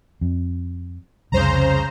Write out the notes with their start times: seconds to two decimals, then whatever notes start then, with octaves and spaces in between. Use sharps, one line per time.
0.21 F2
1.32 C2 F2 C#3 G3 C5 A#5